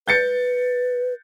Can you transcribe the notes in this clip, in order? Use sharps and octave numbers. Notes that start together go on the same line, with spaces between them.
B4 G6 A6 C#7